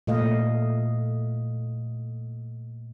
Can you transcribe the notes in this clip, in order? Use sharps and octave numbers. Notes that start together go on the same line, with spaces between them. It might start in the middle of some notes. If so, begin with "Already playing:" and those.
A#2 A3 D#5 F5